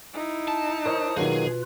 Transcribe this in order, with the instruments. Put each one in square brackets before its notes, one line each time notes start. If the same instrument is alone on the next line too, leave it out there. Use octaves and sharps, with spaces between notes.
[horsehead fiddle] D#4 E4
[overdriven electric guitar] A5
[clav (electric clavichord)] A#4 C#5 D#5 [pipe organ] C5 D#6
[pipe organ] B2 F4 B4 [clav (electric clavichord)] D#3 F#3 A#3 [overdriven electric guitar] G#4